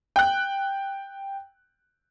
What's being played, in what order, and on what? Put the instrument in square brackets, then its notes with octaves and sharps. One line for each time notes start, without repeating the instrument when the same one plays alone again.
[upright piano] G5 F#6